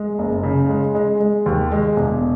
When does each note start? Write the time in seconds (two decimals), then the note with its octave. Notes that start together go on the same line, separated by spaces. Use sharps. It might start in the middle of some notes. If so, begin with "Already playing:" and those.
Already playing: G#3
0.19 F#1
0.43 C#3
0.69 G#3
0.95 G#3
1.20 G#3
1.46 D#2
1.72 G#3
1.96 E1